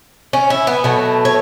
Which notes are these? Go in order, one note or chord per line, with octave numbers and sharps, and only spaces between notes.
C#4
E4
B3
B2 F#3 A3
C#5